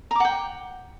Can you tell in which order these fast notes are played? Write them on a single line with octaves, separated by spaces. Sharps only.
A#5 D6 F#5 G5